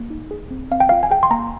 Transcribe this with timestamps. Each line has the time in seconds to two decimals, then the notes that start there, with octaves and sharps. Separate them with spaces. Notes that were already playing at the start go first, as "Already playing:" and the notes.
Already playing: A#3
0.10 D#4
0.31 G#4
0.51 C4
0.71 C4 F5
0.80 G5
0.89 F4 F5
1.03 G#5
1.11 G#4 G5
1.23 C6
1.31 A#3 A#5